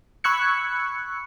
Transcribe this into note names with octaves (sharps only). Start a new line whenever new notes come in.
B5 C#6 E6 F#6 G#6 C#7